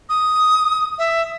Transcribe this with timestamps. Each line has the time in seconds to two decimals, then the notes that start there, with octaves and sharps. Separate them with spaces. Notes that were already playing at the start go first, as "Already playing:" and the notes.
0.09 D#6
0.99 E5